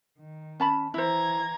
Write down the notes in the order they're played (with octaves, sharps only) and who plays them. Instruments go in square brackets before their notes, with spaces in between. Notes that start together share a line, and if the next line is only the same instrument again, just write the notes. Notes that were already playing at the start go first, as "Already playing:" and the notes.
[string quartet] D#3
[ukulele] C#4 A5 B5
[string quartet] E3 A#5 G#6 [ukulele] E4 C5